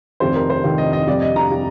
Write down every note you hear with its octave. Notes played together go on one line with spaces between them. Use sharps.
F1 F2 C3 D#3 C5
A#4
C5
F1 F2 C3 D#3
D#5
D#5
F2 C3 G3 D5
D#5
A#5
C3 G3